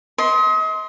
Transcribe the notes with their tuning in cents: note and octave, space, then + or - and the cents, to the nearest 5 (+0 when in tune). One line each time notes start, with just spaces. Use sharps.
D#5 +40 C6 +0